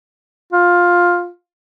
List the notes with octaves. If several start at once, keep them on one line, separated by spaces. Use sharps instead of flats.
F4